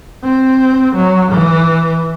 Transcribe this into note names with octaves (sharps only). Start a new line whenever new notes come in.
C4
F#3
E3